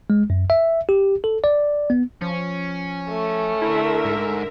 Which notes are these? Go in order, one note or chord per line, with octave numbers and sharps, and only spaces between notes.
G#3
F#2
E5
G4
A4
D5
B3
F3 C#4
A3
D3 E4 A#4 E5
G#2